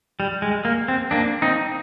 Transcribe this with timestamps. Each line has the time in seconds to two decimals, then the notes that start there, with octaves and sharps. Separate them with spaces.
0.20 G3
0.42 G#3
0.65 A#3
0.88 C4
1.11 A#3 D4
1.42 C4 D#4